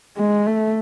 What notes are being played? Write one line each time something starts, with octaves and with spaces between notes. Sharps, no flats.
G#3
A3